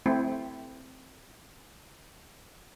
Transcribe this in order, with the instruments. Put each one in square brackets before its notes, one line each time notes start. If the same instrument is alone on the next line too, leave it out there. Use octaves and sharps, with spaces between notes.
[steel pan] A3 C4 E4